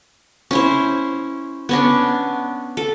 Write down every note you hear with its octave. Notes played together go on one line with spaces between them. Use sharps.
C#4 E4 C5
B3 C#4 D4
A4